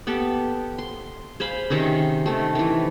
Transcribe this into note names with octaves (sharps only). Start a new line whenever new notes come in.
B3 G4 A4
C6
G#4 C5 F5 B5
C3 D#3 C#4 D#4
D#3 A3
D#3 E3